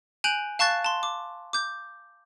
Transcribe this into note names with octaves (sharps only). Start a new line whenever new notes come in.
G#5 F#6 G6 D7 F7 F#7
F5 A5 C#6 F#6 A6
A5 C6
D6
D6 G6